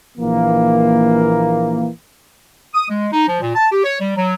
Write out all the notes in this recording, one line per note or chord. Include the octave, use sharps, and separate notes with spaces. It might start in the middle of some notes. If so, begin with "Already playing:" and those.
A#1 E3 A#3
D#6
G#3
D#4
F3
A#2
A5
G4
C#5
G3
F#3